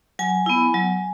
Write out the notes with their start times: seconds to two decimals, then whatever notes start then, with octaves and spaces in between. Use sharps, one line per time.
0.19 F#3 G#5
0.46 B3 E4
0.74 F#3